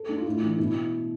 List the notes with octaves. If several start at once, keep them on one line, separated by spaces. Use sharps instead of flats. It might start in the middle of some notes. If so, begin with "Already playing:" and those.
Already playing: A4
D4
F4
A2 E4
E3 D4
B2 E4